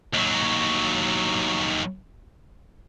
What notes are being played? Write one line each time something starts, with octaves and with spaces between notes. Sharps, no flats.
D#2 F#3